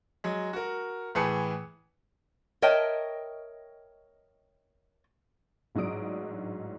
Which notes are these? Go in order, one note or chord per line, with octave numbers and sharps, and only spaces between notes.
F#3 G#3
F#4 A#4
A2 E3 G#4 B4 A5 C#7
A#4 C#5 D#5 E5 G5 A5
A1 G#2 F#3 D4 D#6 D7